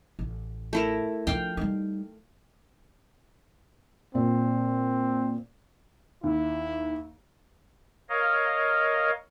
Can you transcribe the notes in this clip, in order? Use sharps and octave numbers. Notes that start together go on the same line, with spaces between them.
A1
A3 E4 A#4
F3 D4 F5 G5
G3 D#4
A#2 C4
D#2 E4
A#4 C#5 D#5 F5